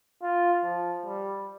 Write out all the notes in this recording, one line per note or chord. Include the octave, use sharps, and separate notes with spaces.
F4
F3
G3